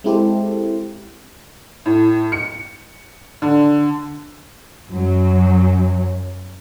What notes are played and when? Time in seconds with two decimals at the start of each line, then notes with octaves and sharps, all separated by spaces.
0.04 G#3 C4 E4 G4 A4 C5
1.86 A2
2.32 C#7
3.42 D3
4.89 F#2 F#3